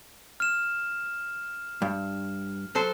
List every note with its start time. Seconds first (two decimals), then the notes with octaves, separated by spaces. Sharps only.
0.40 F6 E7
1.82 G2
2.75 F#3 A4 C5